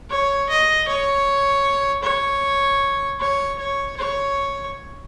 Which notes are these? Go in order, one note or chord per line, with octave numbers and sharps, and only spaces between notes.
C#5
D#5
C#5
C#5
C#5
C#5
C#5